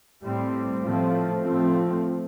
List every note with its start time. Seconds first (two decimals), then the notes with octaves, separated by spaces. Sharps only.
0.23 A2 G3 C4
0.83 A2 F3 A3 C4
1.43 A2 F3 A3 C4